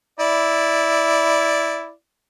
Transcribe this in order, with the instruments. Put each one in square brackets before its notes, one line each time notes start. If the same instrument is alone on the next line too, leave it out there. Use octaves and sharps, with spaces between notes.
[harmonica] E4 D5